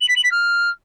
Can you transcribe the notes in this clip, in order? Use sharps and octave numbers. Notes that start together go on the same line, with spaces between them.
F#7
B6
F#7
B6
F6